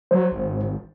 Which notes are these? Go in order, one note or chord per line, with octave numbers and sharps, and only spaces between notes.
F#3 C5
G#1